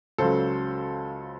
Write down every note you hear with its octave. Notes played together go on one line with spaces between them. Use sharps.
C#2 C#3 F#3 A4 C5